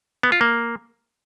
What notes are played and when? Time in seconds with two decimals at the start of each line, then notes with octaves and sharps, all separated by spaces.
0.23 B3
0.32 F4
0.41 A#3